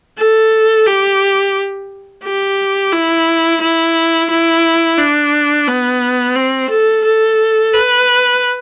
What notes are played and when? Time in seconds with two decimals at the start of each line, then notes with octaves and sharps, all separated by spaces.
0.18 A4
0.86 G4
2.24 G4
2.93 E4
3.61 E4
4.30 E4
4.98 D4
5.67 B3
6.36 C4
6.70 A4
7.05 A4
7.73 B4